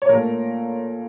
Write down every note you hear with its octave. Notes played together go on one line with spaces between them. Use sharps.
C#5
A#2 A3 A#4